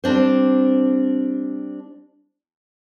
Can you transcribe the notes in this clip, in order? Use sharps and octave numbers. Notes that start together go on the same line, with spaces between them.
G3 C4 D4 C5